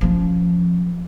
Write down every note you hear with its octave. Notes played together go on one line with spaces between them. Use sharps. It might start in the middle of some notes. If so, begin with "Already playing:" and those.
F3 C#4